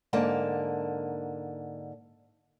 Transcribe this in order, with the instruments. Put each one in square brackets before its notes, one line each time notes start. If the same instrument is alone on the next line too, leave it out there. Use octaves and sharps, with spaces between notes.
[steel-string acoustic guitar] G#2 D3 A#3 A5